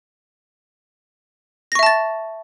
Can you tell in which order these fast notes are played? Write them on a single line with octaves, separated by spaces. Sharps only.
A#6 C#6 E5 A5 A6